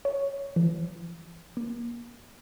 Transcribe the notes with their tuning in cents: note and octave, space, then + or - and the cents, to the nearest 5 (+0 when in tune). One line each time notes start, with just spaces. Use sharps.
C#5 +5
E3 +40
A#3 +25